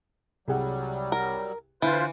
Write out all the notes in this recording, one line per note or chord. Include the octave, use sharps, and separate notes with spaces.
C2 F#3 G3 G#4 F#5
A#4
D3 E3 F4 B4 C5